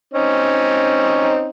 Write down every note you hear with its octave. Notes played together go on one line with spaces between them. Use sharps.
C4 C#4 D#4